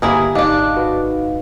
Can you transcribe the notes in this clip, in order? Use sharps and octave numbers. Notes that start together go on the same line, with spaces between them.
G1 D3 A#3 E4 G4 G#4 A#4 G#5
G#1 D4 D#4 D5 D#5 F5
F#4 B4